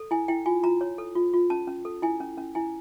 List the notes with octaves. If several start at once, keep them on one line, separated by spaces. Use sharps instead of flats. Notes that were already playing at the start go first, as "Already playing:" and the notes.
Already playing: A4
E4 G#5
E4 G5
F4 G#5
F4 A#5
C#5
A4
F4
F4
C#4 A5
C#4
A4
E4 G#5
C#4
C#4
E4 G#5